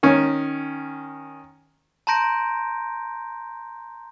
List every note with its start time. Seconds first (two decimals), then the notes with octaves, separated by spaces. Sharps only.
0.03 D#3 C#4
2.07 A5 A#5 C6 G6 A#6 D7